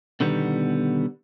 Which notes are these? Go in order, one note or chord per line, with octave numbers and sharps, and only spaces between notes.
B2 D3 D#3 G3 B3